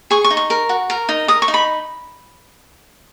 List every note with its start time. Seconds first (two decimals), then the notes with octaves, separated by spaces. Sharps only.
0.11 G#4 C#6
0.24 C#6
0.30 D#4
0.37 C#6
0.50 A#4
0.69 F#4
0.90 A#4
1.09 D#4
1.28 A#4 D#6
1.42 C#6
1.48 D#4
1.54 B5